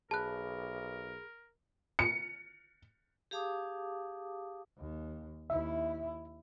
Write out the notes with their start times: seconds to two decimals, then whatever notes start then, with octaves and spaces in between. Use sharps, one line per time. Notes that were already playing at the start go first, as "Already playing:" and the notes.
0.11 B1 G#4 A#4 A5 B5 F#6
1.99 C#7
3.31 G4 G#4 F5 A5 D6 D#6
4.78 D#2
5.50 D#2 E4 E5